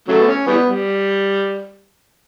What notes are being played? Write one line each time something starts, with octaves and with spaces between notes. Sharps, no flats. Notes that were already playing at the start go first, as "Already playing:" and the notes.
C#3 F#3 A3
B3
C#4
E3 G3 B3
G3